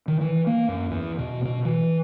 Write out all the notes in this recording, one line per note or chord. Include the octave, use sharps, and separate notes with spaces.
D#3
E3
A#3
F#2
E2
B2
B2
E3